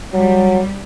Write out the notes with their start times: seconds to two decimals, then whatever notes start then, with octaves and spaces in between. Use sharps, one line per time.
0.14 F#3 G3